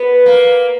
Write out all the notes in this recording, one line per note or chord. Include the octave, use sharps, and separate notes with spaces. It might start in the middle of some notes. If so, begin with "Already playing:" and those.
Already playing: B3
A#3